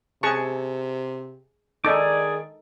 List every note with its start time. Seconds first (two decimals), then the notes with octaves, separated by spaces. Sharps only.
0.23 C3 G#4 A5 C#6
1.85 D#3 D#4 G#4 A4 D5 D6